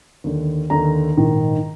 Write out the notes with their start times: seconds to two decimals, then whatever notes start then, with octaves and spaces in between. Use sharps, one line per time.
0.24 D#2 D3
0.70 D#2 D3 A#5
1.17 A#1 G#2 D#3